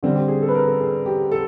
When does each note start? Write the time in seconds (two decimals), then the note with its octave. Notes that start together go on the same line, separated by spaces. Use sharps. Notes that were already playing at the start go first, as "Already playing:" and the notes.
0.03 D3 G3 C4
0.15 G4
0.28 G#4
0.42 A4
0.48 B4
0.55 A#4
0.68 A4
0.80 G#4
1.06 G4
1.31 A4